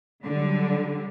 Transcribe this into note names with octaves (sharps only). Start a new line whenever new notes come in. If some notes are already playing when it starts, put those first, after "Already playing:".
D3 F#3 G3